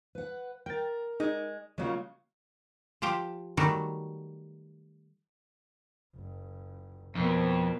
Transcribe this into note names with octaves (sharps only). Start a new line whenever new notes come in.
B4 F#5
A#4 G5 A6
G#3 D#4
C#3 F#3 G#3 A#3 F4
F3 F4 G4 G5
D#3 F#3 G3 A3 F#4 G4
F#1
F2 B2 A#3